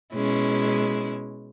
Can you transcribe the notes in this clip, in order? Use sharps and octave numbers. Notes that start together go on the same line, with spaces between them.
B2 G#3 C#4 E4